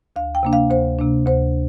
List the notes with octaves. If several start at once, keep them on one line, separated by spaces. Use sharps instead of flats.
D2 F5
G5
C3 A#3 D4
F5
D2 C5
C3 A#3 D4
D2 C5